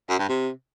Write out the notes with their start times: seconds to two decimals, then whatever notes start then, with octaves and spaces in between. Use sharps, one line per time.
0.09 F#2
0.19 G2
0.29 C3